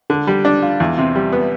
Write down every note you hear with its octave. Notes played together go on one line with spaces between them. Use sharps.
D3
G3
D4
F4
E2
C3
G3
B3